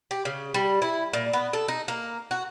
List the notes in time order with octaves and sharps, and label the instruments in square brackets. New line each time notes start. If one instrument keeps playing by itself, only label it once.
[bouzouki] G4
C#3
G3
E4
A#2
B3
A4
D#4
A#3
F#4